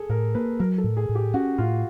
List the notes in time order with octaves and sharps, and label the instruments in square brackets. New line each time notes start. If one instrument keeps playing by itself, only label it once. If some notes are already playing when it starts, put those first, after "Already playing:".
Already playing: [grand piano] G#4 A4
[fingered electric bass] A2 [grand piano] A#4
[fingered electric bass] A#3 [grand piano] B4
[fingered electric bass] F#3 [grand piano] A#4
[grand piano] A4
[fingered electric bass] A2
[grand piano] G#4
[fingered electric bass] A2
[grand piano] G4
[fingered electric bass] C#4 [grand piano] F#4
[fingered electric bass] A2 [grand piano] F4